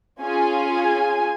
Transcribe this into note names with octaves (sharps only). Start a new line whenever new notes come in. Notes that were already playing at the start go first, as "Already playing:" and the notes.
C#4 F4 G#4 G#5